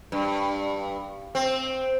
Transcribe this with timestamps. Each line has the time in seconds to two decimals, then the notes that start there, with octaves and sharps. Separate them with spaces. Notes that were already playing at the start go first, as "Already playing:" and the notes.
0.12 G2
1.35 C4